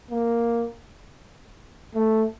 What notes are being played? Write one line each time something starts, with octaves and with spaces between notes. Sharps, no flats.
A#3
A3